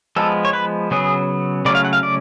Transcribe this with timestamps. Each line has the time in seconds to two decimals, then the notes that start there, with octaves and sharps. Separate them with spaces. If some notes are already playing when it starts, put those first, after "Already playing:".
0.16 F3 G#3 B3 A4
0.45 C#5
0.53 B4
0.91 C#3 F#3 B3 G#4
1.65 C#3 F#3 A3 C#4 D5
1.75 F5
1.85 F#5
1.93 F5
2.03 D5